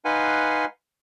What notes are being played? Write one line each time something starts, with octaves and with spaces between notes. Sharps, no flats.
D#4 B4 F5 F#5 G#5 C6